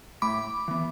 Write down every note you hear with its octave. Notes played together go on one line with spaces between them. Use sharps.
A2 B5 D6
E3 B3